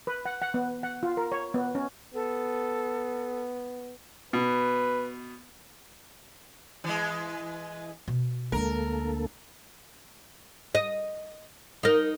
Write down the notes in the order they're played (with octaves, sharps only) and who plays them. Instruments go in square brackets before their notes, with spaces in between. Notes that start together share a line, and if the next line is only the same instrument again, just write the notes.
[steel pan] B4
F#5
F#5
B3
F#5
F4
A#4
C#5
B3
C#4
[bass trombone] B3 [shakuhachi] A4
[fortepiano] B2 [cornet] B4
[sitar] E3 G#3
[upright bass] B2
[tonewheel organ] D2 A#3 A4 [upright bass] G#3 D4 [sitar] A#4
[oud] D#5
D#4 A#4